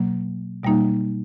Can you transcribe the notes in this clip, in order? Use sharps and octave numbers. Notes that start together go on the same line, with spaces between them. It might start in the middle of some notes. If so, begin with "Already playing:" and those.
Already playing: B2 F#3 A#3
B2 G3 A#3 D#4